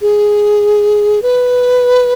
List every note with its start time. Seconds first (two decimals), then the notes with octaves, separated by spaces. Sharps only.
0.01 G#4
1.22 B4